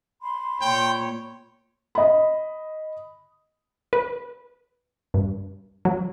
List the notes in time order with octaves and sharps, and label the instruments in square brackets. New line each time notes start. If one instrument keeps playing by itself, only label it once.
[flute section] B5 C6
[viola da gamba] A#2 C#5 [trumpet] G5
[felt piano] D#5 B5
[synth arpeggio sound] B4
G2
F#3